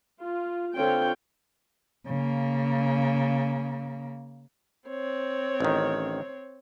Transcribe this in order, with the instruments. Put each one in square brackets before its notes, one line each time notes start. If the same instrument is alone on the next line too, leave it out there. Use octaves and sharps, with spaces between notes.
[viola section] F4
D3 C4 F4 C#5 G5
[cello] C#3 A#3
[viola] C4 C#5
[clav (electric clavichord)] A1 D#3